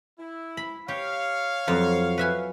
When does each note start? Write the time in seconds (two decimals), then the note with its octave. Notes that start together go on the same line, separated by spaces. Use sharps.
0.19 E4
0.57 B5
0.88 G4 C#5 F5
1.67 F2 F#3
2.18 B4 E5 G#5